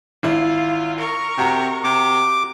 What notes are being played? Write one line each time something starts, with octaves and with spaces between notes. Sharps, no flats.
G#1 E4 F4
A#4 C#6
C3 F#4 A#5
C3 D6